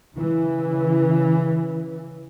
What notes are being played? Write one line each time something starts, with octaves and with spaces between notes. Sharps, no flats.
C#3 E3